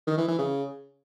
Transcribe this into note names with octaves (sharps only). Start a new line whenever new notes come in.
D#3
E3
E3
C#3